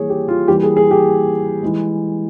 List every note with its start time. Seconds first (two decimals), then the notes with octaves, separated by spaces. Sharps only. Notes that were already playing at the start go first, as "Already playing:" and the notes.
Already playing: E3 G3 A#3 G#4 C#5
0.10 G4
0.28 F4
0.48 E3 G3 A#3 G4
0.63 G#4
0.77 G#4
0.91 G4
1.63 E3 G#3